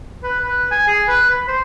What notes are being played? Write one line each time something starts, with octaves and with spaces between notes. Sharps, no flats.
B4
B4
G#5
G#4
B4
B5
C5